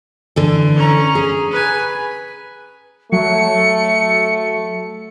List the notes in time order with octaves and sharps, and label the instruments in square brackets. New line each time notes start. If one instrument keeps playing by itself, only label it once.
[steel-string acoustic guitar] D3 E3 A4
[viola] C#4 A#5
[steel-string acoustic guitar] G#4
[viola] B4 G#5
[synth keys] F#3 [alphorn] A3 [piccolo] C#7